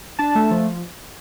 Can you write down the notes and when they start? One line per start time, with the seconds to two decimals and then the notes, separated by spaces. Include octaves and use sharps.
0.19 D4 A5
0.35 A3
0.51 F3